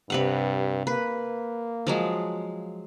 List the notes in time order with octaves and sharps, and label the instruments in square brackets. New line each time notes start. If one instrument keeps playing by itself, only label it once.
[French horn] G2 [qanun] C3 B4 F#5
[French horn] A#3 [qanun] B4
[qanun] F3 F#3 G#3